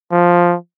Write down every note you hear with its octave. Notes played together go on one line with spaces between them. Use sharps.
F3